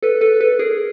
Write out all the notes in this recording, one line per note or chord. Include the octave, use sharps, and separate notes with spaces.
A4 B4
A4 B4
A4 B4
G#4 A#4